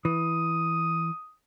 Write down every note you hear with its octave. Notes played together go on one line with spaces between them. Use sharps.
E3 D#6